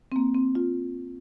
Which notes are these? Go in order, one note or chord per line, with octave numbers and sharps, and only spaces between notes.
C4
A#3
C4
F4